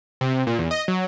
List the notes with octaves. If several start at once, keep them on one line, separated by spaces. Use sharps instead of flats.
C3
C3
A#2
E2
D#5
F#3